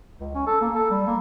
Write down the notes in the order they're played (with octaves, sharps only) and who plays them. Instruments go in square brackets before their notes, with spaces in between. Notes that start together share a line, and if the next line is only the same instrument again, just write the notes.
[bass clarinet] C#2
C#4
A4
A#3
A4
G3
A#3